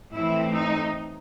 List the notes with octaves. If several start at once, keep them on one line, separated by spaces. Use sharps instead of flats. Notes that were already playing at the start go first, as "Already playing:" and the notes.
A2 E3 C4 E4
D#4